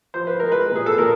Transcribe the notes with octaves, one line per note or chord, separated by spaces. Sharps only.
F3 C5
B4
G#3 A#4
B4
A#2 G#4
A4
A#2 A#4